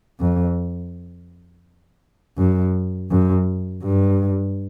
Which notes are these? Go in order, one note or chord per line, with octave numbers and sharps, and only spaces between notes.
F2
F#2
F#2
G2